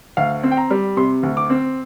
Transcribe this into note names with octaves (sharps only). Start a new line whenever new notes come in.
D2 F5
C4
G5
A#5
G3
C3 C6
D2
D6
C4